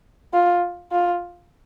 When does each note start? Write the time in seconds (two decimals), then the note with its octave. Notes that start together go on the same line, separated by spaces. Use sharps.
0.33 F4
0.92 F4